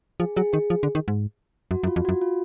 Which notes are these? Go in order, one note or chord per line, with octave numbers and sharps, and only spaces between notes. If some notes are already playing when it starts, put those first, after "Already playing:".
F3 G#4
F#3 G#4
D#3 G#4
F3
D3
D#3
G#2
F#2 F#4
F#2
F4
F2
F#4
F#2
F4